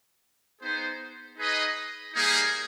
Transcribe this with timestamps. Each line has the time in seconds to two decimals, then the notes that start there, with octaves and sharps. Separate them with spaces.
0.61 B3 D#4 G#4 C5
1.37 D#4 G#4 B4 D#5
2.14 G3 A#3 D#4 G#4